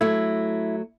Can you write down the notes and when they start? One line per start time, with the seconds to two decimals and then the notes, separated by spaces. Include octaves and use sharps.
0.01 F#3 A3 E4